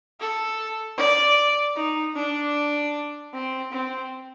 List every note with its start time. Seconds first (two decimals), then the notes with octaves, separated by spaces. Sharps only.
0.20 A4
0.97 D5
1.76 D#4
2.15 D4
3.33 C4
3.72 C4